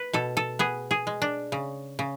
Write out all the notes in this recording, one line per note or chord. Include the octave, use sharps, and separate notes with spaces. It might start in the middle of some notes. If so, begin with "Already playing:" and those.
Already playing: B4
B2 A4
A4
B3 G#4
G#4
G#3
D4
C#3
C#3